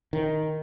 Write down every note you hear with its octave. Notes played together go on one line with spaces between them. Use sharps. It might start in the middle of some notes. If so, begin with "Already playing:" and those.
D#3